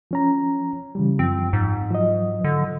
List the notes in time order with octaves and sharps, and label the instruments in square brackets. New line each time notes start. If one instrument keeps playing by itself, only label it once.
[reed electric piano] F3 C#4 A#5
C#3 E3 G3
[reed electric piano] F#2 F3 [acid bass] C4
[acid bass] G#2
[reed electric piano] F3 F#3 D#5
[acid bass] D3